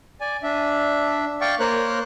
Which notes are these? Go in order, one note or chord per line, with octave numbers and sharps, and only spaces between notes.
D5 G#5
D4 E5
D5 F5 G5 C#6 D6
A#3 A#4 C5 C#5 F#6